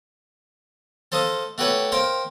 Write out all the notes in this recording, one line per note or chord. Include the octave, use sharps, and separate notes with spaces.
A4 C5 D#5 F5 D#6
A3 F#4 G4 B4 C#5
A#4 C5 F5 G5 C6